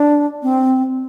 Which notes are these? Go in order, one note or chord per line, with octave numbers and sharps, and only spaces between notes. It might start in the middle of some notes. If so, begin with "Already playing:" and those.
Already playing: D4
C4